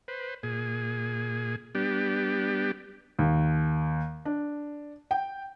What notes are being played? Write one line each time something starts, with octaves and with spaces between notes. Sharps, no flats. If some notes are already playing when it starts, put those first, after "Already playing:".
B4 C5
A#2 G#4
G3 B3 D4 G4
D#2
D4
G5